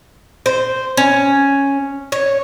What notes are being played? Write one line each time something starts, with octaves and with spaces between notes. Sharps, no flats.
C5
C#4
C#5